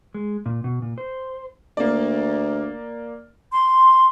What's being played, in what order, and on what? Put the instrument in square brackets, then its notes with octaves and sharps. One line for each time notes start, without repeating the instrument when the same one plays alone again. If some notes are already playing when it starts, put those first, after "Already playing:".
[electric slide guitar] G#3
A#2
B2
A#2
C5
[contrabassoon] D2 [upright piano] A#3 D5
[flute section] C6